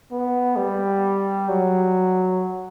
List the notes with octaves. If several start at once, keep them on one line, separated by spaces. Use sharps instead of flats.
B3
G3
F#3